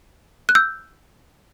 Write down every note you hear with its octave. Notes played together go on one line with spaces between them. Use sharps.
F#6
E6 G6